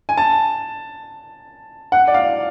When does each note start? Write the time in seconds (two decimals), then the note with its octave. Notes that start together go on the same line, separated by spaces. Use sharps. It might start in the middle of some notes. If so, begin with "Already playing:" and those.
0.09 G#5
0.17 A5
1.92 F#5
2.08 D5
2.14 F5